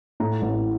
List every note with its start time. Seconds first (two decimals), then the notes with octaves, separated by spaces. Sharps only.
0.20 A2 A#5
0.42 A1